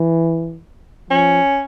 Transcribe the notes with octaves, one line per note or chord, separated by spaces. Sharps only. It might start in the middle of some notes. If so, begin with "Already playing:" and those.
Already playing: E3
F3 C#4